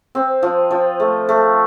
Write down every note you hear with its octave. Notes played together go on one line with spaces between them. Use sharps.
C4
F3
F3
A3
A3